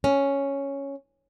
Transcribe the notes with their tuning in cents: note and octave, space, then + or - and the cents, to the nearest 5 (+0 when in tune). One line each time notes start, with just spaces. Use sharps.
C#4 +0